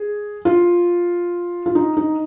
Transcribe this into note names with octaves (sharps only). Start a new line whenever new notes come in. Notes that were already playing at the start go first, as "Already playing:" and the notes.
Already playing: G#4
F4
F4
D#4
D#4